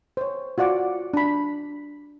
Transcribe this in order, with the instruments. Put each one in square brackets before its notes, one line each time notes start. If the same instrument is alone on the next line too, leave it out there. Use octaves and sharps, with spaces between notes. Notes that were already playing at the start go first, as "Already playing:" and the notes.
[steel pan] C5 C#5
F4 F#4 D5 F#5 D6
D4 B5